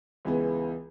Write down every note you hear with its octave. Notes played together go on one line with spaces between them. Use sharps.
C#2 E3 G#3 B3